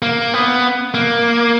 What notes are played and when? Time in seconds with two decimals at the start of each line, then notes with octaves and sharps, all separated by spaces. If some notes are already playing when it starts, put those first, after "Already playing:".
0.02 A#3
0.34 B3
0.94 A#3